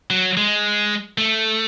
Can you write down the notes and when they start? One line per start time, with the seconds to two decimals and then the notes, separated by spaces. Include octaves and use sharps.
0.10 F#3
0.37 G#3
1.18 A3